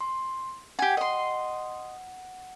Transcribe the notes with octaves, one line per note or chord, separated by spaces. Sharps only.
C6
G4 F#5 G#5
D#5 C6